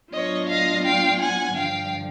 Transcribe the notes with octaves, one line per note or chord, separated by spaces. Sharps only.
A2 F#3 B3 D4 F4 C#5 D#5
D#5 F5
F5 G5
F#5 G#5
G2 D3 F3 F5 G5